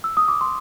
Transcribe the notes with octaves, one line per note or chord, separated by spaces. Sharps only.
E6
D#6
D6
C6